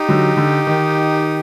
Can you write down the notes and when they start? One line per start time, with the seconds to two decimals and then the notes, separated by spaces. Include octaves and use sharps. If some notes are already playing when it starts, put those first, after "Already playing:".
Already playing: D#4 G4
0.09 D3 F#3
0.37 D3
0.67 D#3